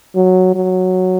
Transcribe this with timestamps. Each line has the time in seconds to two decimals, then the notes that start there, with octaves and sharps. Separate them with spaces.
0.16 F#3
0.55 F#3